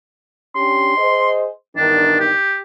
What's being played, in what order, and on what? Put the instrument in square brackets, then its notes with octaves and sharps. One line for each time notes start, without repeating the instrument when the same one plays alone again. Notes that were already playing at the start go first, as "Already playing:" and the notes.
[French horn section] C#4 D4 G4 [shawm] C6
[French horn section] G#4 C5 D#5
[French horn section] E2 G2 D#3 [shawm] D4
[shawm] G4